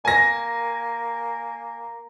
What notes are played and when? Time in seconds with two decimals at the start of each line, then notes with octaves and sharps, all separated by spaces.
0.05 A#3 G#5 A#6